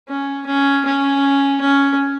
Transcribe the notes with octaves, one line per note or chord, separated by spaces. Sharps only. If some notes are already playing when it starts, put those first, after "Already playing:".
C#4
C#4
C#4
C#4